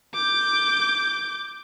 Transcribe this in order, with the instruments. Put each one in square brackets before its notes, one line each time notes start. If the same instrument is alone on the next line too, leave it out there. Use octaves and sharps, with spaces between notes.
[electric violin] D6 G6